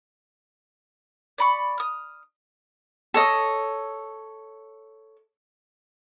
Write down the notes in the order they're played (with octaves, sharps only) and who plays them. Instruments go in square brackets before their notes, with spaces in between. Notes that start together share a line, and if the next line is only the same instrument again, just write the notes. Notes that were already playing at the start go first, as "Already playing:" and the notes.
[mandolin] D5 B5 C#6
D#6 F6
[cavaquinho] A4 C#5 D#5